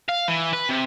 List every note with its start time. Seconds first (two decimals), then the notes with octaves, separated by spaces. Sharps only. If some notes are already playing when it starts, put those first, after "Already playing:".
0.09 F5
0.28 E3
0.53 B4
0.69 C3